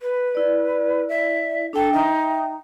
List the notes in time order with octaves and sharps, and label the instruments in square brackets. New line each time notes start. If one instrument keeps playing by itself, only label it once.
[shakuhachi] B4
[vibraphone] E4 D5
[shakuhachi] E5
[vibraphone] D4 G5 [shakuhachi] A4
[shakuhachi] D#4 [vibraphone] E5 G5